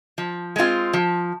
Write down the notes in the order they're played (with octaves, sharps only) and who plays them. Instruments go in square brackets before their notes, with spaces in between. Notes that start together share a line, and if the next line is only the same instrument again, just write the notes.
[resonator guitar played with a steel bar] F3
G#3 C4 F4
F3